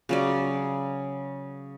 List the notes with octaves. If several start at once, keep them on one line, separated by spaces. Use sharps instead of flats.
C#3 F#3 D5